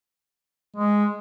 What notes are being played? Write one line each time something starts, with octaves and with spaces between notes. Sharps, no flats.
G#3